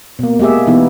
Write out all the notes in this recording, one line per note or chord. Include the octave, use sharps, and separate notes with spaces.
B2 A#3
G#3 A#3 G4 G#4 E5
B2 E3 B3 D#4 E4